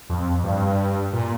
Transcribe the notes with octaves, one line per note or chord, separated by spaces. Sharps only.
F2
G2
A#2